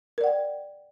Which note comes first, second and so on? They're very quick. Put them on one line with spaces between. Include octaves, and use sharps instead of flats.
A#4 D5 F#5 G5